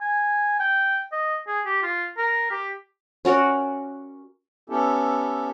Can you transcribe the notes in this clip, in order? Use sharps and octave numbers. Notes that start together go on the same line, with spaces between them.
G#5
G5
D#5
G#4
G4
F4
A#4
G4
C#4 F#4 A#4 D5
B3 C#4 E4 G4 A4